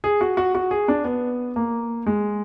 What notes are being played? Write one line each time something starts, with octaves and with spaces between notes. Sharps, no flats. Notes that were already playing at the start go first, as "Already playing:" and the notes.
G#4
F#4
F#4
F#4
G#4
D4
B3
A#3
G#3